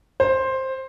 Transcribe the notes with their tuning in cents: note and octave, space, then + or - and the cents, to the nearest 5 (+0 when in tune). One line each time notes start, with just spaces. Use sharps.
C5 +10